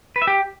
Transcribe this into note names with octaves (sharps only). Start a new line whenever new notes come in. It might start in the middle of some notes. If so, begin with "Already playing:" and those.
B4
E5
G4